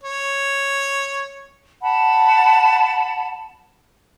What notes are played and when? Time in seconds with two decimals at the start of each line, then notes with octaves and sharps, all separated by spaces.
0.03 C#5
1.81 F#5 A5 B5